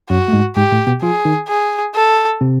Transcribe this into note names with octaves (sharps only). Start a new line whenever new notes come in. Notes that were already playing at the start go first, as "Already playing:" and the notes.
F#2 F#3 F#4
A3
G#2 G#3
G#2 G#3 G4
A2 A3
B2 B3
F3 F4 G#4
D#3 D#4
G#4
A4
C3 C4